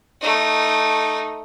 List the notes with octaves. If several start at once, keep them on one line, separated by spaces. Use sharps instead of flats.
A3 D#4